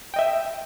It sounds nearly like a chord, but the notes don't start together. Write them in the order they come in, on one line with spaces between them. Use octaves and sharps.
G5 D#5 E5